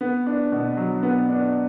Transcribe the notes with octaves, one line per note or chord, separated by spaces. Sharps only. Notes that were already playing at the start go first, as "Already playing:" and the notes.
B3
D4
B2
F#3
B3
D4